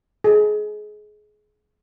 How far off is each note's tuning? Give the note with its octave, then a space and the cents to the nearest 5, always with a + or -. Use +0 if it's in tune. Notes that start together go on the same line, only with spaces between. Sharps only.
G#4 +25